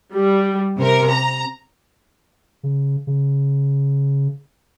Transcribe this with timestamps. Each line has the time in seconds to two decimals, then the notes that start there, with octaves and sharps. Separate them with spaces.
0.14 G3
0.77 C3 A#4
1.11 A#5
2.63 C#3
3.07 C#3